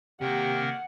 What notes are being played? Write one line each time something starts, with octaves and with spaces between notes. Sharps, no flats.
C3 D#3 A#3 G4 A#4 F#5